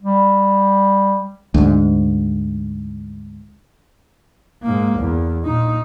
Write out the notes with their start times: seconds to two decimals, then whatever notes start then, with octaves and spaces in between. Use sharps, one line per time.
0.02 G3
1.54 D2 G#2
4.63 G#2 A#3
4.99 E2
5.44 A#2 D#4